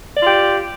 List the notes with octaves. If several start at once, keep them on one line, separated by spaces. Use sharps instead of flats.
F4 G4 D5